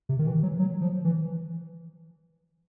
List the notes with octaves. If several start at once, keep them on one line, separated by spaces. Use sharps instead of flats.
C3
D#3
E3
F#3
F#3
F3
E3